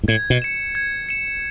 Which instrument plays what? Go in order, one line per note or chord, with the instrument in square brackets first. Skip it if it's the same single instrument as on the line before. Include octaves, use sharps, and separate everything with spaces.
[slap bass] G#2
[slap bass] A2 [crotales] G#6
[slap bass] B2
[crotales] C#7 E7
G#6
C#7 E7